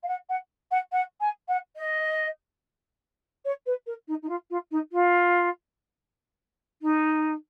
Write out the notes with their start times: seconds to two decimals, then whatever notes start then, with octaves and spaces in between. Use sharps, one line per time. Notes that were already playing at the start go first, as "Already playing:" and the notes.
0.03 F5
0.08 F#5
0.29 F#5
0.71 F#5
0.92 F#5
1.20 G#5
1.48 F#5
1.76 D#5
3.44 C#5
3.66 B4
3.86 A#4
4.07 D#4
4.22 D#4
4.28 F4
4.50 F4
4.71 D#4
4.92 F4
6.81 D#4